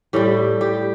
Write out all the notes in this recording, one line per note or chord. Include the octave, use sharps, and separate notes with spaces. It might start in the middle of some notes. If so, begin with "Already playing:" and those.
A2 G3 G4
G4